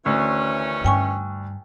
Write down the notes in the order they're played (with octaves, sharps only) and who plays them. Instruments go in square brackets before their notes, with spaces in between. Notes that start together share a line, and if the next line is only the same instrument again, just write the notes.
[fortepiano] D2 [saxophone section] D#3 E3 C#4
[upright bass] G2 [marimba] G5 G#5 C#6